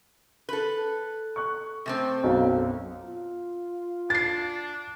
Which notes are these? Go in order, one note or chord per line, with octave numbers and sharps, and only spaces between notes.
A4 B4
C#6 F#6
C3 A3 C4
B1 F#2 F5
F4
D4 A6 C7